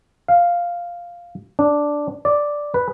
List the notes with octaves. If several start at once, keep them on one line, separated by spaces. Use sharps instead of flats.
F5
D4
D5
B4